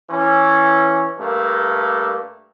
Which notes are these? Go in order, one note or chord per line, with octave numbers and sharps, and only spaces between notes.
E3 C#4
G2 A3 A#3